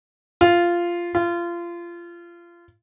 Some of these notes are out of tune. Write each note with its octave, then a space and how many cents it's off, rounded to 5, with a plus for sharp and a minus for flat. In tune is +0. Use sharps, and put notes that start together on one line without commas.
F4 -10
F4 -25